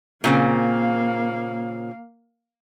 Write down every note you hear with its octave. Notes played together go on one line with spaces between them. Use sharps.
A#2 C#3 A#3 C4 F5